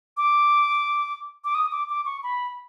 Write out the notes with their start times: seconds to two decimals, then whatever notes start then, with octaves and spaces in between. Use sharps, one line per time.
0.17 D6
1.45 D6
1.55 D#6
1.72 D6
1.89 D6
2.06 C#6
2.23 B5